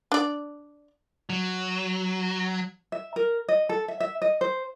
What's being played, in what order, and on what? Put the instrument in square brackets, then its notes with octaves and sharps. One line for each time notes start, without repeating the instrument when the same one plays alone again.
[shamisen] D4 D5
[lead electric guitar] F#3
[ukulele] E5
A#4
D#5
A4
E5
E5
D#5
C5